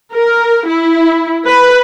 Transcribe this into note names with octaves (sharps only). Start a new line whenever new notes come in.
A#4
E4
B4